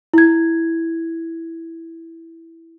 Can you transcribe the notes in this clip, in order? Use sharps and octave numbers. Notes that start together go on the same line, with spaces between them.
E4 G#6